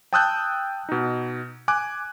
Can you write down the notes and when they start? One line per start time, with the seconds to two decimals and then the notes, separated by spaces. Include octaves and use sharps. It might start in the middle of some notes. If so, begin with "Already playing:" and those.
0.13 G5 A5 D#6 E6 F#6 G6
0.89 B2 D#4
1.68 G#5 D6 F#6